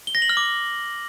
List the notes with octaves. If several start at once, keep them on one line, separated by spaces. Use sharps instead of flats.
G7
A#6
F#7
F6
D6